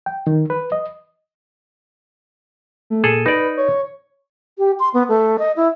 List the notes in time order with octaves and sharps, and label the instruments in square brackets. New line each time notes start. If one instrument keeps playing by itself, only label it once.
[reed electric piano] G5
D#3
B4
D#5
[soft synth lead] A3
[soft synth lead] A#2 [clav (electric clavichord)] G#4 A4
[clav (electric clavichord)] D#4 D5 [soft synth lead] B4
[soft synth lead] C#5
[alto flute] G4
C6
B3
A3
D#5
E4